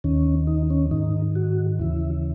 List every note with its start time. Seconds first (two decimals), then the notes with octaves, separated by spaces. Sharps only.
0.04 D#2 D#3 C#4
0.47 D#4
0.70 C#4
0.91 G#2 D#3 D#4
1.36 F#4
1.79 D#2 C#3 E3 E4